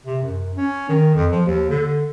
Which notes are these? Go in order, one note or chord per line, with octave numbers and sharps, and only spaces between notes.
C3
F#2
C#4
D#3
F2
F3
D#2
D3